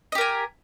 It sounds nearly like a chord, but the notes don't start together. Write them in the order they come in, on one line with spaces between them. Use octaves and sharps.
D#5 G4 A#4 G#5